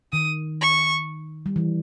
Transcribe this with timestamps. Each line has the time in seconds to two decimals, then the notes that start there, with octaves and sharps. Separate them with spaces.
0.12 D#3 D#6
0.61 C#6
1.46 G3
1.56 E3